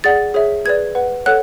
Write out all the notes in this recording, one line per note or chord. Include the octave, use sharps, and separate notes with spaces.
G#4 D5 F#5 A6
G#4 C#5 E5
G#4 B4 D5 G#6
B4 F#5
A4 C#5 F#5 F#6